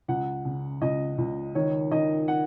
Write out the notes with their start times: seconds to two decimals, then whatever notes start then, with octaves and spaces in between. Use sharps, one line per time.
0.08 C#2 F#5
0.45 C#3
0.81 C#2 D#5
1.18 C#2
1.55 D#3 C#5
1.91 D#3 D#5
2.28 F#5